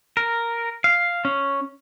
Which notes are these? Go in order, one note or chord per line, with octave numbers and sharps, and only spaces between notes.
A#4
F5
C#4